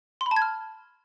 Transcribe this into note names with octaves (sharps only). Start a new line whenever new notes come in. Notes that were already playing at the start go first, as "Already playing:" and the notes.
C6
B5
A5
G#6
F6